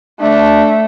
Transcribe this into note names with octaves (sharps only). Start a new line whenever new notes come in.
A3 D4